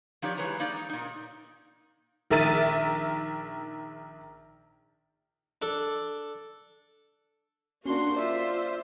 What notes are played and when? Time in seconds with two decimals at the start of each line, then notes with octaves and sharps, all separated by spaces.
0.22 F3 D#4 G4 B4 C#5 D5
0.38 E3 G#3 B4 C#5 A#5
0.60 A#3 D#4 D5
0.76 D#4
0.90 A#2 D#4
2.30 A#1 D#3 A#4 E5 A6 D#7
5.62 D4 A4
7.86 A#3 C#4 D4 F#4 C6
8.16 F4 C5 D5 E5